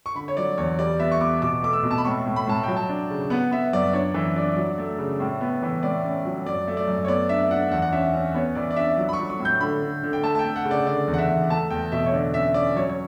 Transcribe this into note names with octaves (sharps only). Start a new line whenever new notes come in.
C#6
D3 B5
C#5
F#3 D5
E2 C#5
G3 D5
B3 E5
C#6
B3 D6
B2 D6
A3 D6
E6
B2
A5
B5
A2 C#6
A2
B5
A2 A5
F#3 G5
A5
D4
C#3
B3 F#5
B3 E5
F#2 D5
D4 C#5
E3
D4 D5
F#3
A3
C#3
A2
B3
E3
A2 D5
C#4
F#3
F#2 D5
A3
D5
F#2
C#5
B3 D5
D4 E5
D4 F#5
E2 F#5
F#5
C#4 E5
C#4
B3 C#5
E3 D5
D5
D4 E5
F#3
B5
C#6
F#3
C#6
A2
G6
D3 B5
D3
D3
G5
A3 A5
A5
G5
A3
F#5
C#3
D5
D3 D5
E2
F#5
E5
E2
A3 A5
E2 G5
B2 E5
C#5
D3 D5
C#4 E5
C#4 D5
F#3 C#5
C#5